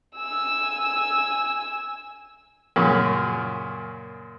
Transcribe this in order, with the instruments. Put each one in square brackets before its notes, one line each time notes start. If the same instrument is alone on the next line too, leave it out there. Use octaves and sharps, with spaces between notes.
[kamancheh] G#5 E6
[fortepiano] F#2 A#2 C#3